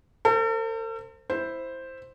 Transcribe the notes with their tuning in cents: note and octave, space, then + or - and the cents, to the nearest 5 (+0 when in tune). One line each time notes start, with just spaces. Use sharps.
A4 +45 C5 +0
E4 +0 C5 +0